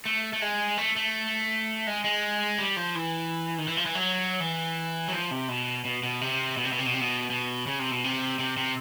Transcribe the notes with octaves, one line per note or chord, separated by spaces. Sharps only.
A3
A3
G#3
A3
A3
G#3
G#3
G3
F3
E3
D#3
E3
F3
E3
F#3
E3
F#3
F3
C3
B2
B2
B2
C3
B2
C3
B2
C3
B2
C3
B2
B2
C#3
C3
B2
C3
C3
C3